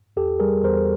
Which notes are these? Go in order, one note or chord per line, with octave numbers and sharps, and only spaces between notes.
E2 G4 A4
G3 G#4 A#4
E2 A#4 C5